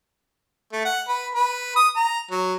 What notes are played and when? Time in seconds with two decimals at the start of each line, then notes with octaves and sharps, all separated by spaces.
0.72 A3
0.85 F#5
1.08 B4
1.35 B4
1.76 D#6
1.96 A#5
2.31 F#3